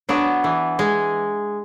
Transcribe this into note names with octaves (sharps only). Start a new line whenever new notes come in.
F#3 B3 D4
E3
G#3